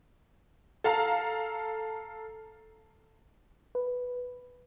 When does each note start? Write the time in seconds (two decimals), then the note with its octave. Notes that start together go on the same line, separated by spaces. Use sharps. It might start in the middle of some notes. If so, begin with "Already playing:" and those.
0.84 A4 F5 A#5
3.75 B4